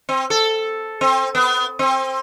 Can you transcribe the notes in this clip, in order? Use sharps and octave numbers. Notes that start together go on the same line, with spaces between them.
C4
A4
C4
B3
C4